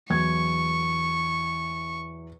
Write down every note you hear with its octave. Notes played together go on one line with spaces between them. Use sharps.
E2 F#3 C#6 G#6